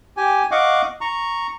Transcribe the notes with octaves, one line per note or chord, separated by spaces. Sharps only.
G4 G#5
D#5 F5 F#5 C#6 D6
A#5 C#6